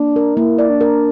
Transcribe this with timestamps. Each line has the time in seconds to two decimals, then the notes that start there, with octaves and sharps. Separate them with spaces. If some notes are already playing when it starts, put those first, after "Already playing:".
Already playing: A#3 D4
0.16 A#4
0.37 A#3 E4
0.59 D5
0.69 D4
0.81 A#4